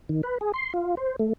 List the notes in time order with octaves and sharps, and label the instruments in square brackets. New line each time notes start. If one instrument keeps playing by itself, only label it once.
[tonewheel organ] D#3
B4
G#4
C6
F4
C5
A3